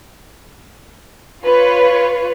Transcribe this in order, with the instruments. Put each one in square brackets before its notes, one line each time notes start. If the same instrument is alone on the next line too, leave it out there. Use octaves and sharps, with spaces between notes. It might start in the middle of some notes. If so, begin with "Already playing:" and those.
[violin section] F4 B4 C#5